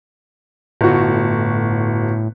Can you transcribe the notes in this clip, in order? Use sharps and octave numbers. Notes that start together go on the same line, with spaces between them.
G1 A2 F#4